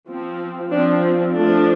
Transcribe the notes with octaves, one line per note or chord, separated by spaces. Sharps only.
F3 C4
F3 C4 D4
F3 A3 D4